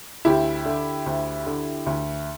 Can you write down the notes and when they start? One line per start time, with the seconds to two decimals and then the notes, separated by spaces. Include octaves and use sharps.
0.25 D2 E4 G4
0.65 D3
1.06 D2
1.46 D3
1.86 D2